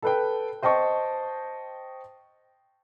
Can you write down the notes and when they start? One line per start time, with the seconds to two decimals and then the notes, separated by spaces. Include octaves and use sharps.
0.03 A4 B4 G5
0.62 C5 D#5 G5 A5 C#6